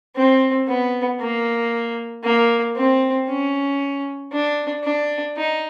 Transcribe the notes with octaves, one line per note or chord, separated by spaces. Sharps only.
C4
B3
A#3
A#3
C4
C#4
D4
D4
D#4